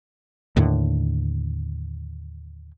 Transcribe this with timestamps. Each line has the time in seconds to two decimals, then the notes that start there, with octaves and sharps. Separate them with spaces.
0.56 D#2 A2 D3